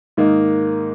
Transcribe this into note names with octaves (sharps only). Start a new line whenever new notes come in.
G#2 D#3 A#3 D#4